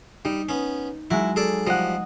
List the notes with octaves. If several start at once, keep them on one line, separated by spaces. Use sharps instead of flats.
G3 D#4
B3 C#4
F#3 G#3 E4
G#4 A4 D5
F3 G3 D#5 F#5